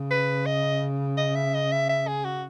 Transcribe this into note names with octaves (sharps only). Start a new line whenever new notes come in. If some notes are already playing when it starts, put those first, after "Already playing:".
Already playing: C#3
B4
D#5
D#5
E5
D#5
E5
E5
G#4
F#4